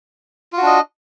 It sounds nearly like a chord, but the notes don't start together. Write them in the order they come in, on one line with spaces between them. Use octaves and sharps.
F4 F#4 D4 D#5